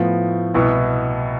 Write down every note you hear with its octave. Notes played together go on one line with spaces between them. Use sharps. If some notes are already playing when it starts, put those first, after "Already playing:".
Already playing: A2 F3 B3
C2 B2 B3 E4